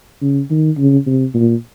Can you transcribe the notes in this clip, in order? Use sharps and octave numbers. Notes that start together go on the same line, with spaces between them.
C#3
D#3
C#3
C3
A#2